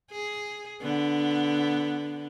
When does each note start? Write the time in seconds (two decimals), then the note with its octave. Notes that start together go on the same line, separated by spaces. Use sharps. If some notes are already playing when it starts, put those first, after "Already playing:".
0.11 G#4
0.82 D3 B3